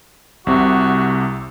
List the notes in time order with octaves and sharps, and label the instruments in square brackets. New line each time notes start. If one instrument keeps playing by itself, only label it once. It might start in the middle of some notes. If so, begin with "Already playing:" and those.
[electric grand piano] C2 C3 [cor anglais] F#4